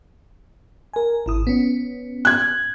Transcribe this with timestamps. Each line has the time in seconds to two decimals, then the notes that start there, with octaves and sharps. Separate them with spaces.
0.94 A#4 G#5
1.26 G#1 E4 D#6
1.47 B3 C#4
2.25 F#6 G#6